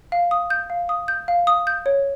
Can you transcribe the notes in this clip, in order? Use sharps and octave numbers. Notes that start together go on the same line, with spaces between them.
F5
D#6
G6
F5
D#6
G6
F5
D#6
G6
C#5